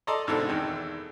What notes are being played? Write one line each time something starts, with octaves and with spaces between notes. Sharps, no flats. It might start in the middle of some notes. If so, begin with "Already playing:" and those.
A4 D5 D#5 A5 A#5 C6
A1 G#2 B2 D3 C4 A4
E2 D#3